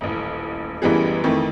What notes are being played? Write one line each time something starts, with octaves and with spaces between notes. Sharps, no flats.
D#1 A1
A1 F#2 E3 G3 B3 G#4
F2 D#3 E3 A3